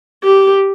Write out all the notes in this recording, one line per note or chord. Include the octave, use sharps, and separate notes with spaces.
G4